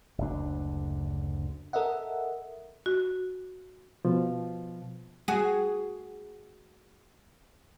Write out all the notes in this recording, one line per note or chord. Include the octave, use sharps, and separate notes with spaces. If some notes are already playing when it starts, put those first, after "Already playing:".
F#1 D2 D4
A4 A#4 D#5 E5 F#5
F#4
B2 F3
F#4 G#4